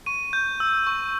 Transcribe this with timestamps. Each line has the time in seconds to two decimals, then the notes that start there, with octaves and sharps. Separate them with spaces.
0.06 C#6 D#7
0.33 G6
0.60 E6
0.87 C#6